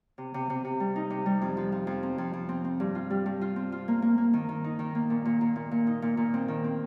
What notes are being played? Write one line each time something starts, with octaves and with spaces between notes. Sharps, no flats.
C3
C3
C3
C3
G3
D#4
C3
G3
F2
F3
F3
F2
C4
F2
F2
C4
C4
G2
F4
G3
G2
F4
C4
F4
A#3
A#3
A#3
D#3
D#3
D#4
D#3
A#3
A#2
A#2
A#2
A#2
A#2
D#4
A#2
A#2
C4
D#3
C4